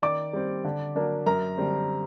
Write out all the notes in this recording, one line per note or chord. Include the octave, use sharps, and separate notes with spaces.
D#3 D5 D6
G3 C4
D3
F#3 A#3 D4
F#2 A#4 A#5
D3 G3 C4